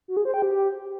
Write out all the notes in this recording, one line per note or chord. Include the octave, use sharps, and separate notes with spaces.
F#4
G#4
C5
G5
G4